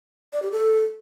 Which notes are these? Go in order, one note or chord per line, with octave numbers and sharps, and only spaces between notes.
D5
G4
A4